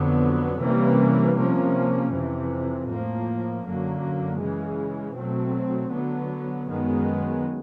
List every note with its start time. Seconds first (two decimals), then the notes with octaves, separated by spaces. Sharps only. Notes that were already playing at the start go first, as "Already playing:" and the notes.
Already playing: F2 D3 F#3 B3
0.60 C3 E3 G3 A#3 C#4
1.36 C3 F3 A#3 C#4
2.11 F2 C3 E3
2.88 A2 F3 A#3
3.63 F#2 D3 F#3 A#3
4.39 C#3 E3 G#3
5.15 B2 F#3 A3 C4
5.91 D3 F#3 B3
6.67 F#2 D#3 G#3 B3